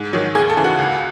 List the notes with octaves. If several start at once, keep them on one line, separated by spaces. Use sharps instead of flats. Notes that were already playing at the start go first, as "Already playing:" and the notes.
Already playing: G#2
D#3 F#3
D#2 G#4
A4
C#3 E3
F#4
C#2